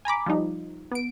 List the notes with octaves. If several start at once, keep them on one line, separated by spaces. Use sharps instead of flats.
G#5 A#5 B5 D6
F3 G3 D#4
B3 D7